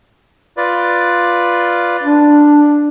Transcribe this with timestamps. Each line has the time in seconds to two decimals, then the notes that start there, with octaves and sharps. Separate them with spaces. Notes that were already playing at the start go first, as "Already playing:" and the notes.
0.57 F4 B4 D5
2.03 D4